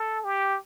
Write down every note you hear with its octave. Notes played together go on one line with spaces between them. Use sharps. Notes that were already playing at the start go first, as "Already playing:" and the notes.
Already playing: A4
G4